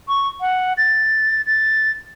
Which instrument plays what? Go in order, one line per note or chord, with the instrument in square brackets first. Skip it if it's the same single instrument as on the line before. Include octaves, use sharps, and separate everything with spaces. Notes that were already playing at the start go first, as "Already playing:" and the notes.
[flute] C#6
F#5
A6
A6